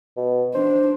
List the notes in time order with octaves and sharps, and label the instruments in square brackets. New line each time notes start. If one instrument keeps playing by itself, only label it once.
[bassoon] B2
[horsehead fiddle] D4 [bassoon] C5